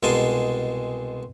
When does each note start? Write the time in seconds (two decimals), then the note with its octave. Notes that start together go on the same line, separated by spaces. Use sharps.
0.03 C2 B2 G#3 G#4 A5 C6